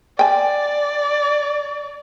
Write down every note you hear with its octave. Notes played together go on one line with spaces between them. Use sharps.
D5 G5 G#5